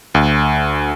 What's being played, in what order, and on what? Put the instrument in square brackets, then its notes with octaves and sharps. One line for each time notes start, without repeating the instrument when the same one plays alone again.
[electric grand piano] D2